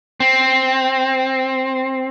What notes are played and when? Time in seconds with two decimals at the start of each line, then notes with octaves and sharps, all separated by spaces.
0.20 C4